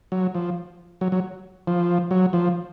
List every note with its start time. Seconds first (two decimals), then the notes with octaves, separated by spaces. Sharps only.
0.12 F#3
0.35 F3
1.01 F#3
1.12 F#3
1.67 F3
2.11 F#3
2.33 F3